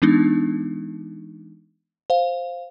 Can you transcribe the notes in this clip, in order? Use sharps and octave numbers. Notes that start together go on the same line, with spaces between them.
E3 G#3 B3 D4 D#4
C5 F5